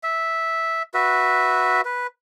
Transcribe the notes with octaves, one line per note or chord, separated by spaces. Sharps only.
E5
F#4 B4 E5
B4